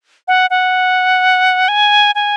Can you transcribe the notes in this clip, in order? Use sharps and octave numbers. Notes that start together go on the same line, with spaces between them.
F#5
F#5
G#5
G#5